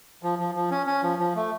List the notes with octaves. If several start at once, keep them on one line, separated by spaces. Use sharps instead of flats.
F3
F3
F3
C#4
C#4
F3
F3
A3